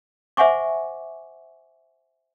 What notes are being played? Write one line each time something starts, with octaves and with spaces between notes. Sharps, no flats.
C5 E5 F#5 G#5 C#6 D6